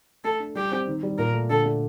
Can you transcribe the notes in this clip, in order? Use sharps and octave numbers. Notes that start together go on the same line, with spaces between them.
A3 A4
D4
G3 G4
C4
D#3
G3
A#2 A#4
A3
D3 A4
A3